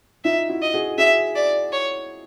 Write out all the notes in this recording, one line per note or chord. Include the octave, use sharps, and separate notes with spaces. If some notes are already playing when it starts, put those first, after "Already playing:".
D#4 F4 E5
E4 F#4
D#5
F#4 G#4
F#4 G#4 E5
D5
C#5